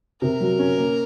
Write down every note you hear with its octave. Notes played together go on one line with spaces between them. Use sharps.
C3 A#4
F#3
C#4
A#3